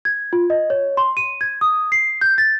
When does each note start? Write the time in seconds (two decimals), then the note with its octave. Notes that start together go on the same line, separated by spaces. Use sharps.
0.05 G#6
0.33 F4
0.50 D#5
0.70 C#5
0.97 C6
1.17 D#7
1.41 G#6
1.61 D#6
1.92 C7
2.21 G6
2.38 A6